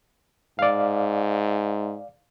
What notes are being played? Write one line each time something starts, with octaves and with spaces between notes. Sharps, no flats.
G#2 D5 F5